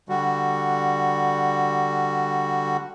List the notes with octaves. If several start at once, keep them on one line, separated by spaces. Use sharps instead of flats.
D3 G3 F#4